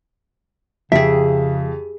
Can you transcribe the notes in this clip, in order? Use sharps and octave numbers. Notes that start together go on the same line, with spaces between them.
F2 C#3 G4 G#4 E5